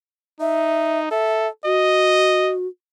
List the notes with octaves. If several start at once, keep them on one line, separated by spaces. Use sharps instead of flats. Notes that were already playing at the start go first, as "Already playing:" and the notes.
D#4 E5
A4 E5
F#4 D#5